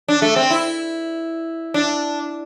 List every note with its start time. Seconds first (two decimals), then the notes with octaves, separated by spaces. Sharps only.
0.08 D4
0.22 A3
0.36 C4
0.50 E4
1.74 D4